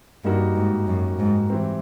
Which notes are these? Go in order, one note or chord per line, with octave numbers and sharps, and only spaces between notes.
G2 G3 A#3 D#4 F#4 A#4
G#2
F#2
G#2
E3 G3 C4